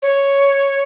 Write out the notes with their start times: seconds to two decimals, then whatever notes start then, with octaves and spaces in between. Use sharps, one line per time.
0.03 C#5